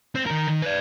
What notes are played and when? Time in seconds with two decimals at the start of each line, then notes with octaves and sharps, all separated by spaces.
0.15 C4 C5
0.26 D#3 A#4
0.48 D#3
0.62 B4 D5